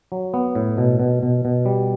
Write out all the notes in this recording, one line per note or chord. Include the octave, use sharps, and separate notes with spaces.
F#3
B3
A2
B2
B2
B2
B2
G3